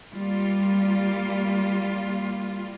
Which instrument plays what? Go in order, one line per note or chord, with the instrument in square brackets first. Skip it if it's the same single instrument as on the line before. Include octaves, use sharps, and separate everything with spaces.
[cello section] G3 A#3 F4